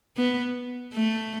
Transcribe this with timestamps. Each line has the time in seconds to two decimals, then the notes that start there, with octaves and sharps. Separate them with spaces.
0.16 B3
0.93 A3